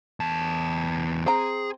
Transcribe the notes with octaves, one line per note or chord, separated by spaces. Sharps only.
E2 A5
C4 G#4 A#5